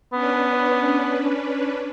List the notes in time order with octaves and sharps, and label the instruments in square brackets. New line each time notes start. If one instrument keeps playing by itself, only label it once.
[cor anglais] B3 [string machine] C#4 D4 B4